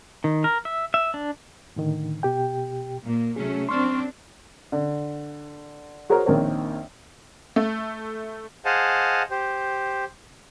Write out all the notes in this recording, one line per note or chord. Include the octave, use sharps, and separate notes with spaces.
D#3
A#4
E5
E5
D4
A2 D3 D#3
B2 G4 G5
A#2 A#3
C3 F#3 A3 C#4 G#4
F#2 C4 D4 C6 C#6 F6
D3
F#4 G#4 A#4 C5 C#5 A#5
A#1 D#3 C4 A#4 C#5
A3
G#4 C5 D#5 F5 F#5 A5
G4 C5